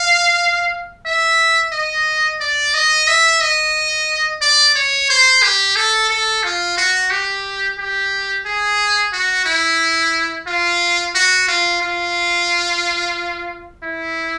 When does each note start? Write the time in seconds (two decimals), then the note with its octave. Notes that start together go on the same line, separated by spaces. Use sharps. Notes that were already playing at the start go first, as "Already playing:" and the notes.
Already playing: F5
1.06 E5
1.72 D#5
2.40 D5
2.74 D#5
3.08 E5
3.41 D#5
4.41 D5
4.75 C#5
5.10 C5
5.43 G4
5.76 A4
6.10 A4
6.43 F4
6.77 F#4
7.11 G4
7.79 G4
8.46 G#4
9.13 F#4
9.46 E4
10.47 F4
11.15 F#4
11.48 F4
11.82 F4
13.83 E4